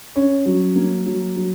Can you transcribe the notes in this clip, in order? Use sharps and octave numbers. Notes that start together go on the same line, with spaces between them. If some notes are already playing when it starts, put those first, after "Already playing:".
C#4
F#3
A#3
F#3
F#3